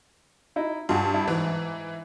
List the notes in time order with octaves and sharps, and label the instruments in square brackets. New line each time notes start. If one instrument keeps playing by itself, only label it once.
[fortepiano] D#4 E4 D#5
[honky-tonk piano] G2 [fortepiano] F4 F#4 G#4
[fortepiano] E4
[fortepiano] G#2 [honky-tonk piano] E3